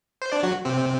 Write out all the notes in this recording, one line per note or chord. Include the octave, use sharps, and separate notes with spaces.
C5
D4 D5
F#3 F#4
C3 C4